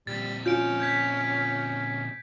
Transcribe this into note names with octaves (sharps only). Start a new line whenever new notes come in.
A#2 G3 C4 A6
C#4 F4 G6 D7
G6 G#6 B6